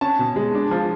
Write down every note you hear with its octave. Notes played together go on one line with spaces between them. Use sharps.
C#4 A5
B2
G#3
D4
F3